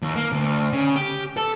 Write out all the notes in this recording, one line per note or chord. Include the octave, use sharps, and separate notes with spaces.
D#2
A#3
D2
C#3
G4
A4